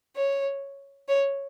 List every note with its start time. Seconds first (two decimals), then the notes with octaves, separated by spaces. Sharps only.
0.16 C#5
1.09 C#5